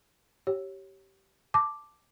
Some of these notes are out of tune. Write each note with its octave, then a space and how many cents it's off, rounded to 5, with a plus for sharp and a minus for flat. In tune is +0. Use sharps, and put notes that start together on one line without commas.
G4 -20 C#5 -10
A5 +0 D6 +0